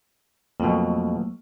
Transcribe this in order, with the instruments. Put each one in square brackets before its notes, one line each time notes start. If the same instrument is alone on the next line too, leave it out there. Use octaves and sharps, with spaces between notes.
[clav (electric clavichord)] F2 B2 [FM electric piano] F#3 A3 A#3